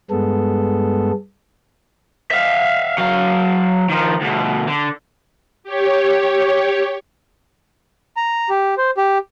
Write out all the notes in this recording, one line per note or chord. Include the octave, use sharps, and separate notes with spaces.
G2 G#3 B3 A4
E5 F5
F#3 F5
D#3 F3
D2 B2
D3
G4 C#5
A#5
G4
C5
G4